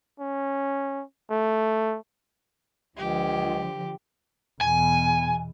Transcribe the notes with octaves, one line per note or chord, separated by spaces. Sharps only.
C#4
A3
C#2 D3 F3 G4
E2 B2 G#5